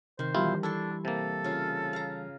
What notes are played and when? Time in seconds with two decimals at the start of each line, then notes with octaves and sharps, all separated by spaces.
0.19 C3 D#3 C5
0.35 B1 E3 G3 E4 F4 G4
0.63 D4 E4 A4 C6 C#6
1.05 C3 A#3 A4
1.44 C#3 F4
1.93 F5 A#5